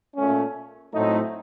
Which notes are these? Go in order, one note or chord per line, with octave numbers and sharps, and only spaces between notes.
A#2 A3 C#4
A2 F#3 A3 C4 D#4